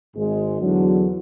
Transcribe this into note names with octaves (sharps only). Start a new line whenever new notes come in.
G#1 G#2 G#3
E2 D3 F#3